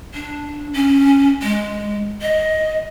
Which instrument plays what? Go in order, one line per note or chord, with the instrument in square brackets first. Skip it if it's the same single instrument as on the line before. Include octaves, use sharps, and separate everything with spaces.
[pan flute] D4
C#4
G#3
D#5